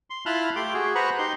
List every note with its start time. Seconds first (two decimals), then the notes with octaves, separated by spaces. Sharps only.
0.10 C6
0.26 E4 F4 A5 B5 F6 F#6
0.56 A3 G4 C6 D6
0.74 F#4 G#4
0.95 B4 C5 F#5 A#5 B5 C#6
1.18 D#4 G4 C6